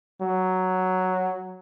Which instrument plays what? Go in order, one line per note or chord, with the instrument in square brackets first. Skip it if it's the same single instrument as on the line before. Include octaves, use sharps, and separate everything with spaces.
[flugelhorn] F#3